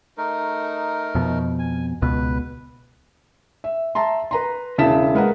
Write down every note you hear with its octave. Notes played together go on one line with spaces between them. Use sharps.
A3 D#4 A#4
F2 B2
G#5
C#2 B2 B4
E5
E5 A5 A#5 C6
B4 A#5 C6
E1 C#3 E4 A5 B6 E7
G#3 A#4 B4 F#5